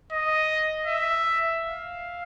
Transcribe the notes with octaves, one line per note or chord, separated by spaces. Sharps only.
D#5
E5
F5